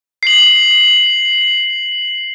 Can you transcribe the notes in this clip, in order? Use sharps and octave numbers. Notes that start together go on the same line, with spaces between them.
C7 F#7